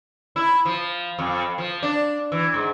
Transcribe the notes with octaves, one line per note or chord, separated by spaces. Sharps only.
E4
F3
F2
F3
D4
E3
G#2